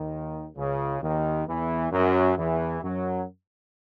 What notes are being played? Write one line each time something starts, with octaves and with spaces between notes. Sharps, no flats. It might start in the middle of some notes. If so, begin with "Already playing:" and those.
Already playing: D#2 D#3
C#2 C#3
D#2 D#3
E2 E3
F#2 F#3
E2 E3
F#2 F#3